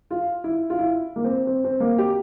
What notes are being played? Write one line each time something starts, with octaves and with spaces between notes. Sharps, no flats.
F4
E4
F4
E4
A#3
C4
C4
C4
A#3
G4